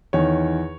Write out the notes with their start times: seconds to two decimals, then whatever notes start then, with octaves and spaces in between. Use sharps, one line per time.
0.13 E2 D#3 C#5